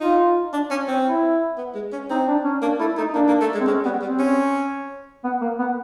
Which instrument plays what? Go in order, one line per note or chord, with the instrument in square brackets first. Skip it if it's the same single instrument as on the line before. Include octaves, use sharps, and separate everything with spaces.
[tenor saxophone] D#4 [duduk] F4
[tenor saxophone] D4
C#4
C4
[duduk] E4
[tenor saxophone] B3
G#3
C#4
[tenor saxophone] C4 [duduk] D#4
[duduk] D4
C#4
[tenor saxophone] A#3 [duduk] D4
[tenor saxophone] A3 [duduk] E4
[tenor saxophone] A3 [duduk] D#4
[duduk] D#4
[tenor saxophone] A#3 [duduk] D4
[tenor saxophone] A#3
A3
G#3
[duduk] C4
[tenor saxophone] G#3 [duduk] C#4
[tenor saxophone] G3 [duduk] B3
[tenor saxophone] G3 [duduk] C4
[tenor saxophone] C#4
[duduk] B3
A#3
B3